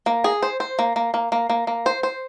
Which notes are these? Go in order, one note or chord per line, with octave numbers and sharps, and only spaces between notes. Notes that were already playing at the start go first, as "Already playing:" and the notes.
A#3
G#4
C5
C5
A#3
A#3
A#3
A#3
A#3
A#3
C5
C5